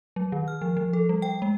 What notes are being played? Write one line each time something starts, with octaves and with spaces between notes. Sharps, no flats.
F#3
D#3
F6
F3
F3
A4
G3
G5
G#3